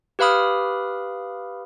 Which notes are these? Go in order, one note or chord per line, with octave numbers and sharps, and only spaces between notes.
G4 B4 F5 B5 D#6 F6